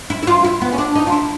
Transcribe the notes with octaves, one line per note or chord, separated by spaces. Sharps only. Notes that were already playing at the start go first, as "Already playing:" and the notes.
E4
E4
F4
E4
B3
C#4
D4
D#4
F4
E4